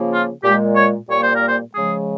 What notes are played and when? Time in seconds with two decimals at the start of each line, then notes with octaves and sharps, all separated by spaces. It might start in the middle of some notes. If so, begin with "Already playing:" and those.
Already playing: C#3 F3 A#3
0.10 F4
0.43 A#2 G#3 G4
0.75 C#5
1.08 A#2 G3 A#3 C#5
1.20 C5
1.33 A#4
1.46 C5
1.72 C#3 F3 G#3 G#4